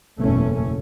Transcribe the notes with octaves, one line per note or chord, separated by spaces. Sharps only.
F#1 E2 B2 A3 C#4